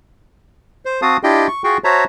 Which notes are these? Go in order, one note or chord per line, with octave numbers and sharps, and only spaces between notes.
C5
C4 F#4 F5 A5 D#6
D4 E4 F4 G4 D#5 G5
C#6
F4 F#4 G#4 G5 C#6
F#4 C5 C#5 E5 A5 A#5